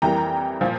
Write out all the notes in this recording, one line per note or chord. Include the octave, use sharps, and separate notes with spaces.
F2 E3 G3 A#3 G5 A#5
A#2 F3